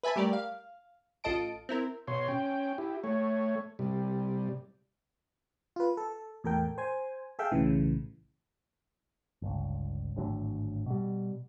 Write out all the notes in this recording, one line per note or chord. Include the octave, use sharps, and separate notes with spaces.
B4 E5 G#5 A5 B5
G3 A3 G4 A#4 D5
F5
A1 F4 A4 D#5 A5 D7
C4 E4 A#4
B2 C#5 C6
C#4 G5
E4 G4
A3 C#5
C3 G3
F4 B4
A4
E2 A2 A4 A#4 G5
C5 G#5
G#4 A4 E5 F5 G5
B1 A2 C#3 E3
G1 C#2
G#1 A2 D3 F#3
B2 G3